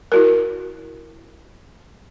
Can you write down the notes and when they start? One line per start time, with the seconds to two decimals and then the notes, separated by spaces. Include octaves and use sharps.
0.12 E4 F#4 A#4